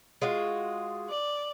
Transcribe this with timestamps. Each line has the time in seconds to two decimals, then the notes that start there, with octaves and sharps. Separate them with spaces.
0.22 G#3 F4 F#4
1.09 D5